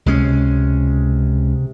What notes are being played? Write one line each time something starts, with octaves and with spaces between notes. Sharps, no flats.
C#2 C3 G#3 C#4